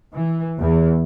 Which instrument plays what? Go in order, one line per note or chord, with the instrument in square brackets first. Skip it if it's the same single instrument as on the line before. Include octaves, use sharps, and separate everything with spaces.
[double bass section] E3
E2